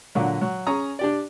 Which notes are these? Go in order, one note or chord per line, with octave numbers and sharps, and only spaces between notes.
A#2 D3 F#3
F#3
C#4 G#4 G#5 A#5 D#6
D4 G4 D5